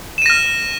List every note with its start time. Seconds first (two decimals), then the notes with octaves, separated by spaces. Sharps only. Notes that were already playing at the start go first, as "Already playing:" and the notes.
0.18 E7
0.22 D#7
0.26 A#6
0.30 F6